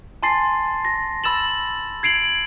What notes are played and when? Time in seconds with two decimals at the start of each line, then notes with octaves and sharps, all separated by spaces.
0.23 G#5 A5 C6 A6 C7
0.85 A#6
1.24 B5 E6 A6 E7 F#7
2.03 G#6 C7 D7 F7 F#7